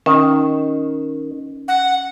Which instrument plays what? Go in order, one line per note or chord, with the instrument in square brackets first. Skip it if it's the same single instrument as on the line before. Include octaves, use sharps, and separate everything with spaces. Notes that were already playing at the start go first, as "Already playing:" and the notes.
[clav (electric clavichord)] D#3 [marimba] C#4
[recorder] F#5